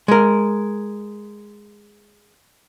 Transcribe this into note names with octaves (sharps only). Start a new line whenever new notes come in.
G#3 A#4